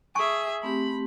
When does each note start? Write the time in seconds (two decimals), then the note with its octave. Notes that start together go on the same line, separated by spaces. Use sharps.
0.15 G#4 E5 G#5 A5 C#6
0.63 A3 C4 G4 B5